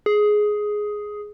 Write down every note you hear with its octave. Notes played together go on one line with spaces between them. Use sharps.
G#4